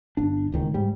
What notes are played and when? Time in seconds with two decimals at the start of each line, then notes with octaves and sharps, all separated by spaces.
0.17 G1 D4
0.52 D1 C#2 D#3
0.74 G#2 G3